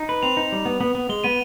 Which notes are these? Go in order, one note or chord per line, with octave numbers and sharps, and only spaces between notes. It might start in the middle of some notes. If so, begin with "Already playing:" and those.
Already playing: D#4
B4
C4 F7
D#4
G3
B3
B3
B3
G#3 G7
B3 D#7